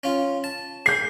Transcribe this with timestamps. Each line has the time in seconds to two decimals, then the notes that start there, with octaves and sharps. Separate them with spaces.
0.03 C#4 F4
0.44 A5
0.86 G#4 G6 C7